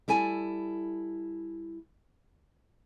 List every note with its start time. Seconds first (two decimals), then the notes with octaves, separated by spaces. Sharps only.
0.08 G3 E4 A4 G#5